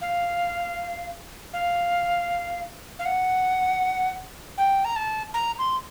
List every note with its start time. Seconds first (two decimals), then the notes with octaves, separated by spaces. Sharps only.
0.01 F5
1.53 F5
2.99 F5
3.06 F#5
4.58 G5
4.85 A#5
4.96 A5
5.34 A#5
5.59 C6